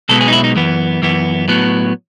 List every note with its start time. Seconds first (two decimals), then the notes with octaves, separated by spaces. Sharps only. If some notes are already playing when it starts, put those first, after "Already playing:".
0.09 B1 B2 G#3 B3 A4
0.21 G#4
0.28 D#4
0.32 E4
0.44 D#4
0.55 F#2 E3 B3
1.02 F#2 E3 B3
1.48 A2 F#3 B3